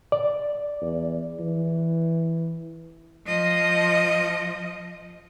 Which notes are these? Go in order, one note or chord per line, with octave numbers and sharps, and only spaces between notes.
D5
E2
E3
F3 D#5